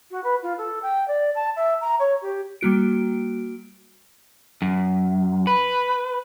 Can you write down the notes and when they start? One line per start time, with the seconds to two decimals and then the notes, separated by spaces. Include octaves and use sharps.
0.11 F#4
0.24 B4
0.43 F4
0.58 A4
0.82 G5
1.08 D5
1.35 A5
1.56 E5
1.81 A#5
1.99 C#5
2.22 G4
2.61 G3 A#3 F#4 D7
4.62 F#2
5.47 B4 B5